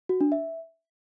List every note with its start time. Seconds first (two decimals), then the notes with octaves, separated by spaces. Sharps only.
0.09 F#4
0.21 D4
0.32 E5